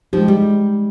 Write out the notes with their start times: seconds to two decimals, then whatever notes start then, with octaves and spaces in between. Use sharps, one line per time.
0.13 F3 G#3 D#4 G4
0.28 G3